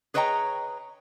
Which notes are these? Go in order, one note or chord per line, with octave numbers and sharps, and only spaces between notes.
G#4 B4 C#5 D#5 G5 A#5